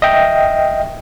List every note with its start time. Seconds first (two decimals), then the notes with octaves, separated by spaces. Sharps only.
0.02 D#5 E5 G5